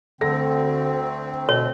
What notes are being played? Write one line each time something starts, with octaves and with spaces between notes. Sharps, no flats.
D2 D3 C4 A4 A#6
B2 C#5